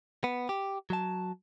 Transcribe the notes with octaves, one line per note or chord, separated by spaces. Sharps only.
B3
G4
F#3 A5